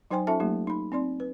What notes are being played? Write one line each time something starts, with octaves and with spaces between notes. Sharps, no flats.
F#3 D#4 C5 G5 G#5 C6
C#4 D#4 F4 A4 E5 A5
F#3 A3 A#3 D#4 G4
D#4 B5
C4 D#4 D5 C6
B4